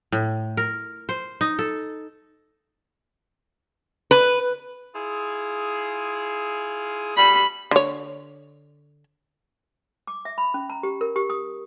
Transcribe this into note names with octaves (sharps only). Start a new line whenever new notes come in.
A2
A#4
C5
D#4
A4
B4
E4 F4 G#4
D2 G2 G3 B5
D3 C#5
D6
E5
B5
C#4
A#5
G4
A#4
G4
D#6